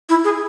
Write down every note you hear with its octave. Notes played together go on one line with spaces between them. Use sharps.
E4
G#4